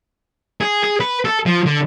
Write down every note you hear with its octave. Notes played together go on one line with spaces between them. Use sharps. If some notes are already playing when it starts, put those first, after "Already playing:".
G#4
G#4
B4
A4
F3
D3